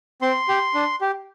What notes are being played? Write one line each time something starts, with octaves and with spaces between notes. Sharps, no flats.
C4 C6
G4
D4
G4